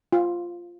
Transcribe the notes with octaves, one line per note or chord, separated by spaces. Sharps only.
F4